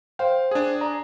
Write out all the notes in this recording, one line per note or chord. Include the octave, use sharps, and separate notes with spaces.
C5 F5 G5
D4 G#4
D5 A#5